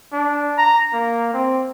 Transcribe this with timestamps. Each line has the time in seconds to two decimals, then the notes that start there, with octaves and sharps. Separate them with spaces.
0.13 D4
0.58 A#5
0.93 A#3
1.34 C4